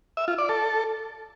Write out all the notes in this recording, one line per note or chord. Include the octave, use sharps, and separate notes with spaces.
E5
F4
D5
A4